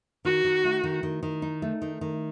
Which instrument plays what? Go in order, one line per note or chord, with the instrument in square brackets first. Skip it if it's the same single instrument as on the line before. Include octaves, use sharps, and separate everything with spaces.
[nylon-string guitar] D#3 [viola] F#4
[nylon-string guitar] D#3
A3
D#3
D#3
D#3
D#4
A3
D#3
D#3